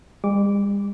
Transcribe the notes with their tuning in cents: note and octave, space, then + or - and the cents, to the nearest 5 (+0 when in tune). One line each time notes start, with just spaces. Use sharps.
G3 +45 D6 -10